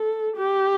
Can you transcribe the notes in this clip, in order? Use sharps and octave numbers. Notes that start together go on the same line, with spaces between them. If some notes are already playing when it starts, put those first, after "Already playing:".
Already playing: A4
G4